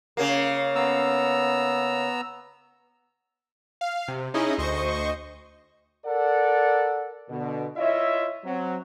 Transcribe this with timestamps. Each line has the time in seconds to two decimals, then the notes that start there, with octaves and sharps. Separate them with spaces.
0.17 C#3 A#3
0.75 B3 A#5 E6
3.81 F5
4.08 C3
4.34 C#4 D#4 E4 G#4 D#5
4.58 D2 C5 D#5 C#6
6.05 A4 A#4 D5 F#5
7.29 B2 D3
7.77 E4 F4 C#5 D#5 E5
8.45 F#3 C4